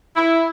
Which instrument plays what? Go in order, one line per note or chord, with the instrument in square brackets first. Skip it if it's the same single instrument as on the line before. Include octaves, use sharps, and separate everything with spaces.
[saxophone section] E4